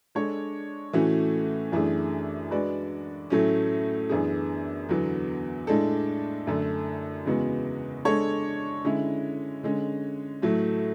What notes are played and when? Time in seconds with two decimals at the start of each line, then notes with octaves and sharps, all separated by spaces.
0.15 G#3 D4 A4 C#5
0.93 A2 E3 A3 C#4 F#4
1.72 F#2 E3 A3 D4 G#4
2.51 G#3 D4 F#4 B4 D5
3.30 A2 F#3 A3 C#4
4.09 F#2 E3 B3 D4 G#4
4.89 E2 D3 F#3 B3
5.67 A2 G#3 D4 A4
6.47 F#2 D3 A3 D4 A4
7.26 E2 C#3 G#3 B3 F#4
8.05 G#3 D4 A4 C#5
8.85 D3 G#3 C#4 E4
9.63 D3 G#3 C#4
10.42 A2 F#3 A3